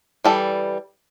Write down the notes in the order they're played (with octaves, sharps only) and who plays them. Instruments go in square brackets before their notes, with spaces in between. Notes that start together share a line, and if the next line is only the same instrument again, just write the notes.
[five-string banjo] E3 G3 A4